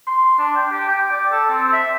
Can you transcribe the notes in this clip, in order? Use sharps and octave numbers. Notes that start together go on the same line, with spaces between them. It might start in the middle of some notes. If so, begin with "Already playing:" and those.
C6
D4
G5
G4
G5
D5
A4
C4
E5